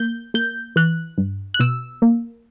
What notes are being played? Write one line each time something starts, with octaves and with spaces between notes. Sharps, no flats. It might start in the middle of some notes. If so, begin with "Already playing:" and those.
Already playing: A#3 G6
A#3 G6
E3 F#6
G2
F#6
B2 E6
A#3